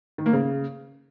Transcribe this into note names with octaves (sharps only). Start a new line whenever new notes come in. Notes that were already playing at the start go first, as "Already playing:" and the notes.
D#3
A#3
C#3